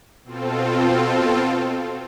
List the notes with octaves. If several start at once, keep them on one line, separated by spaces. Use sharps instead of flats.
B2 C4 F4 A4